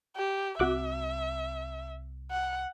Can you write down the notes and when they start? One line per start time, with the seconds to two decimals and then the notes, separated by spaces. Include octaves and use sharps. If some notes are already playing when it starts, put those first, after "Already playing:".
0.16 G4
0.59 C2 C4 F#4 E5 D6 F#6
2.31 F#5